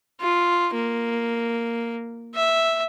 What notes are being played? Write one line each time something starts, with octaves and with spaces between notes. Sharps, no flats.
F4
A#3
E5